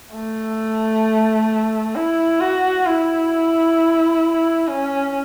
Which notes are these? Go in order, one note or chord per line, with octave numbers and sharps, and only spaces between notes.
A3
E4
F#4
E4
C#4